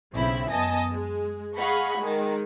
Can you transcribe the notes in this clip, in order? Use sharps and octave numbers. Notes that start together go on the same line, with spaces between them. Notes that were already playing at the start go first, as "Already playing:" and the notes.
B1 C#3 C4 E4 E5 B5
F#2 B3 D#5 G#5 A5 A#6
G#3
G#4 D#5 F5 F#5 B5 C#6
D#3 G#3 G#4